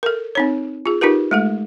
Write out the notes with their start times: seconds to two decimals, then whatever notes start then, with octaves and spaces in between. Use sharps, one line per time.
0.03 A4 A#4
0.35 C4 D#4 C#5
0.86 F4 G#4
1.01 D#4 F4 G4 A#4 B4
1.31 G#3 A3 A4